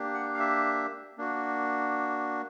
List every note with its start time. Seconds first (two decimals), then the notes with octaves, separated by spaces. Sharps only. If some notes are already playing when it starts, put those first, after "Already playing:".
Already playing: A#3 D4 G4
0.14 F#5
0.34 F5
0.39 E5
1.18 A#3 D4 F#4